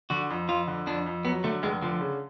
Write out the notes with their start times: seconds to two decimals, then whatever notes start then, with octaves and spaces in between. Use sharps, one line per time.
0.10 D3 F#4
0.30 F2
0.48 F2 F4
0.68 D3
0.86 F2 D4
1.06 F2
1.25 F#3 B3
1.44 D3 A3
1.63 F1 G#3
1.82 D3 F3
2.01 C#3